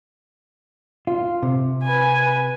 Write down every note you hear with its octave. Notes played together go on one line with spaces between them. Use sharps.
F4
C3
B4 G#5